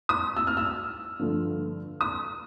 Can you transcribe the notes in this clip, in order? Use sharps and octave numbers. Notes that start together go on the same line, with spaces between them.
D#6
E6
F6
E6
G2 D3 F3 A3
D#6